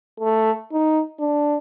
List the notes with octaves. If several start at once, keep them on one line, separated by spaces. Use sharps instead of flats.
A3
D#4
D4